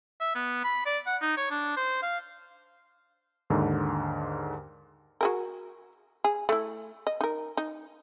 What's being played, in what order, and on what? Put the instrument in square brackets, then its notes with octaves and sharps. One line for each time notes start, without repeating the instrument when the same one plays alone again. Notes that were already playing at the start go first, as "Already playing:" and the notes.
[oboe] E5
B3
B5
D5
F#5
D#4
C#5
D4
C5
F5
[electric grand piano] D#2 G#2 D3
[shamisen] F#4 G#4 A#4
G#4
A3 E4
D#5
D#4 A#4
D#4